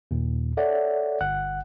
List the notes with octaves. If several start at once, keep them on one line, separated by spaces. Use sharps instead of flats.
D#2 A#2
A4 C#5 D5 E5 F#5
G1 F#5 F#6